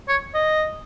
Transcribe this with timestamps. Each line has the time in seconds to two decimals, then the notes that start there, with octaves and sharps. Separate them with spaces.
0.08 C#5
0.34 D#5